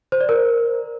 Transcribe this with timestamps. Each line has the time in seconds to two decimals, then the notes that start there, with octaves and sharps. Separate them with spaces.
0.12 C5
0.21 D5
0.29 A#4